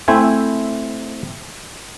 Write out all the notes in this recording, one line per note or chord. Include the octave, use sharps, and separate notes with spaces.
A3 C4 E4 C5 E5 G#5